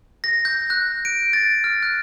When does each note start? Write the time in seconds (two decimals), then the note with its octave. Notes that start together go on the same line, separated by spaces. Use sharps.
0.24 A#6
0.45 G6
0.70 F#6
1.05 D7
1.33 A6
1.64 F6
1.83 F#6